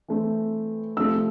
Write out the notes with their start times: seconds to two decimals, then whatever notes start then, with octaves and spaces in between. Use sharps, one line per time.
0.08 E3 A3 C4
0.97 C3 F3 A3 C4 E6